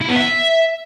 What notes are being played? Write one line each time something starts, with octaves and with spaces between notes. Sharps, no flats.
E4
B3
E5